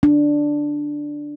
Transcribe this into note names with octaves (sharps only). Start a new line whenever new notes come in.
D4